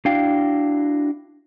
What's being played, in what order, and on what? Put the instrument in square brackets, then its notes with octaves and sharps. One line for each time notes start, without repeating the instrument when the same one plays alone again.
[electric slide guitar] D4 E4 F#4 F5 G5